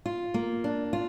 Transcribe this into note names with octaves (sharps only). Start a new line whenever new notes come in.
F4
A#3
D4
F4